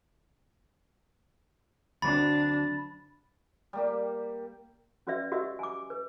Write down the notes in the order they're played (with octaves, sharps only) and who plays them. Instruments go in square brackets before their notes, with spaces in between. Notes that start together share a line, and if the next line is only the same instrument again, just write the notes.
[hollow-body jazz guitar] D2 F#3 C4 [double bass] D4 [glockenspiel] B5 A6
[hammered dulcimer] G3 A#3 G4
[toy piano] C#4 F#4 B4 D5 E5
F#4 G4 D#5 E5 E6
G#5 D6
B4